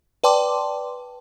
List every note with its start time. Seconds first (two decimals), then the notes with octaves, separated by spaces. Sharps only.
0.24 B4 D5 G5 A5 C6 D6